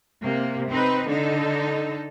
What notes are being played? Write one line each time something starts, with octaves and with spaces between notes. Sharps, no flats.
C3 A#3
C4 D#4 B4
D3 D#4 A4